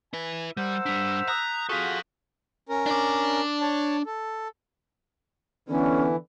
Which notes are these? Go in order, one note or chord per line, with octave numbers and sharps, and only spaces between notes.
E4 B4 G#5
G3 A#4 C5 F#5 E6 G6
G3 D4 B6 F7
A#5 D#6 F#6
F4 F#4 G#4 A4 F5 F#5 C#6 B6
C#4 A#4
D4 D5
C#5 A5
A4
D3 E3 B3 C#4